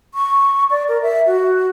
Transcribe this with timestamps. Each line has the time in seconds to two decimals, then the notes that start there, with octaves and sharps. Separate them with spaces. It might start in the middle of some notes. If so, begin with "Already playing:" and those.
0.14 C#6
0.70 D5
0.88 A#4
1.02 E5
1.27 F#4